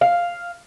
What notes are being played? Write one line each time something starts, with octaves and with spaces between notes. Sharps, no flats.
F5